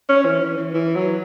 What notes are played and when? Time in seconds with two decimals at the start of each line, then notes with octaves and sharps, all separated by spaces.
0.09 C#4
0.25 E3
0.42 E3
0.58 E3
0.74 E3
0.96 F#3